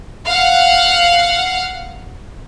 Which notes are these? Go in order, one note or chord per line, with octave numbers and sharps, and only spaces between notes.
F5 F#5